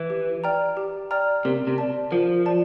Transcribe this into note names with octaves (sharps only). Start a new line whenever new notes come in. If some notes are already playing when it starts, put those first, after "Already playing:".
Already playing: E3
G4
D5 G5 A#5 F6
G4
D5 G5 A#5 F6
C3 A#4
C3
D5 A5
F3 A#4
D5 A5